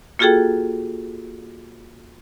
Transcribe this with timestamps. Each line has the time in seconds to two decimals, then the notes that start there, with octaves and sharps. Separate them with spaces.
0.19 A#3 F4 F#4 G#4 A4 G5